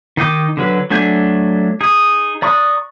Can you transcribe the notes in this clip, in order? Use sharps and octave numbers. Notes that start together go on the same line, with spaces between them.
D#3 D#4 G5 D6
D3 F#3 B4
F#3 A3 D4 G#5 G6
D#4 G#4
D5 A#5 C#6 D#6 F#6